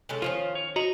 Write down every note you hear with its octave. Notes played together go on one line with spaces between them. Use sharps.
C#3 G#3 A4
D#3 F3 C#4 F4 C5
C#5
F#4 D#5 A#5